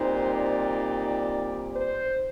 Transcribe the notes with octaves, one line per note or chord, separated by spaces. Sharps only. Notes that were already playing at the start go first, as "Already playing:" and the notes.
Already playing: A#2 G3 C4 D#4 C5
D5
C5